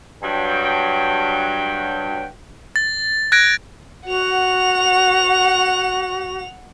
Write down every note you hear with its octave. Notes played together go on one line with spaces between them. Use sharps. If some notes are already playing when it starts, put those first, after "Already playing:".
G2 F#3 G5
A6
F#6 G#6 A#6 D7
F#4 F#5 F7